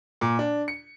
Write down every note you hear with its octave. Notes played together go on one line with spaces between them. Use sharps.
A#2
D4
C#7